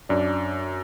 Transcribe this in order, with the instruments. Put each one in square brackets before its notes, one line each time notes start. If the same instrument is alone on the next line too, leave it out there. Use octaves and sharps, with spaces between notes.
[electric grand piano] F#2 [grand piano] D4